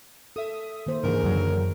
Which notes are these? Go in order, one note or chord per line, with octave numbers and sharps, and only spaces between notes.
A4 E5 D#6
D#3 A#3 C5
G#2 C#3 E3 A#3 D4 G#4 A#4
F#2 D3 E3 F#3